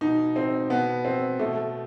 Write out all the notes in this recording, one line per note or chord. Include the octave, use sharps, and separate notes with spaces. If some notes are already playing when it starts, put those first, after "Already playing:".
B2 D#4
C4
B2 B3
C4
B2 A3